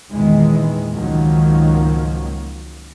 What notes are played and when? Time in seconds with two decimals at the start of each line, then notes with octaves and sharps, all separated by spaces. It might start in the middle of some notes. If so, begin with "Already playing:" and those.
0.12 E2 A#2 D#3 E3 G#3
0.92 C#2 G#2 D#3 F3 F#3 A#3